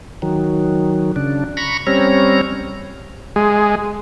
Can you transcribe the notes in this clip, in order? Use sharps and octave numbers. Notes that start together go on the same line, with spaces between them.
D#3 F#3
C#3 D4
A#5 B5 C#6
G3 C4 C#4 C#5 A#5
G#3